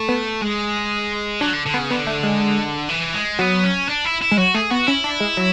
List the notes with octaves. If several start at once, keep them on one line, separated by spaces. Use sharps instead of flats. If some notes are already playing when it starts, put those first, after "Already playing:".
Already playing: A3
B3
G#3
F#3 D4
D3
D3
B3
C#3
D3 B3
A3
G#3
E3
G#3
F#3 B3
C#4
D4
E4
E4
G#3
F#3 F#4
A3 G#4
B3 F#4
C#4 E4
D4
G#3
F#3